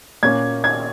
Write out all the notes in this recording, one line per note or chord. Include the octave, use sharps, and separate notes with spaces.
A#2 A#3 C#4 G#6
G#6